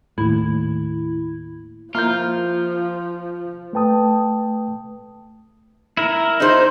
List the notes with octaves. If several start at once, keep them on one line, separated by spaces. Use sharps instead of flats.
D#2 A2 E4
F3 A#3 E4 F4 A#4 F6 G6
A3 B4 G5 A5 D#6
E4 A#4
D#4 C5